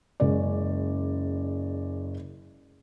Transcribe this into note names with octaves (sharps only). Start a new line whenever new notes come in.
F#1 G#3 C#4 D5